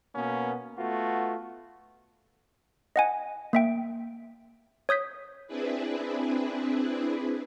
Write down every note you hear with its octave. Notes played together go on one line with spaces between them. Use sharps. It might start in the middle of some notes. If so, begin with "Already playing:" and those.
B2 A#3 B3 C#4
A3 B3 F4 F#4
D#5 F#5 G#5
A#3 E5 G5
C#5 D#6 G6 B6
C4 D4 E4 G#4 B4